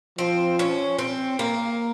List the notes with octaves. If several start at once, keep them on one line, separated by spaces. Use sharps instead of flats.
F3 C4
C#4
C4
A#3